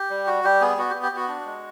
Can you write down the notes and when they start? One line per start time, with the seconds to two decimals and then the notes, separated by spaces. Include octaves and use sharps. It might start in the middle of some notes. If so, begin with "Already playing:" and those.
Already playing: G4
0.10 G3
0.27 F#4
0.44 G3 G4
0.61 B3 G#4
0.77 B3 F#4
0.90 G4
0.94 B3
1.03 G4
1.12 B3 F#4
1.28 D4
1.46 G#3